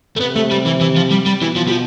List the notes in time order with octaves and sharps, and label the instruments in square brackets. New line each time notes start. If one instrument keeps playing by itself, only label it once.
[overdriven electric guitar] A3
[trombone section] C3 [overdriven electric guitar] B3
[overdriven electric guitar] A3
G3
E3
E3
F3
G3
G3
[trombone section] B2 [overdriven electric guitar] E3
[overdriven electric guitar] F3
G3
F3